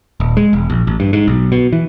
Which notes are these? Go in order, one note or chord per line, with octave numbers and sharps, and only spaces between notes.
D#1
G#3
E1
A#1
A1
G2
G#2
B1
B2
E3